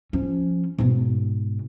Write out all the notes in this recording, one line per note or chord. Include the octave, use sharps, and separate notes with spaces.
F3 C#4
G#2 B2